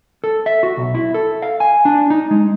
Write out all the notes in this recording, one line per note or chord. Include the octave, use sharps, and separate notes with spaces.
A4
E5
F#4
B1
E4
A4
F5
G#5
D4
D#4
G#3